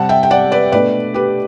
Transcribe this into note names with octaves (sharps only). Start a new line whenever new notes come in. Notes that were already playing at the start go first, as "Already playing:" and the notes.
Already playing: C3 G3 C4 F#5 A5
E5 G5
G5
D5 F#5
B4 D5
B2 A3 D4 B4 D5
G4 B4